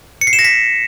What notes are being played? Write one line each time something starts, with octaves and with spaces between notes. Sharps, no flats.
C#7
C7
E7
A#6
B6